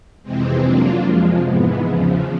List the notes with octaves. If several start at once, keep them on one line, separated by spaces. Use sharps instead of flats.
F2 C3 E3 G#3 C4
F#3 A#3 D4 F4
F2 C3 F3 G#3
G#2 E3 G#3 B3
E2 C#3 F3